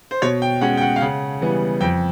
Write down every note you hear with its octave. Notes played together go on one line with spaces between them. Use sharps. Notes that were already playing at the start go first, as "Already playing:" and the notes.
C5
B2 C#5
G5
G#3 C#4 F#5
G5
F#5
F5
C#3 F#5
E3 G3 B3
F2 G5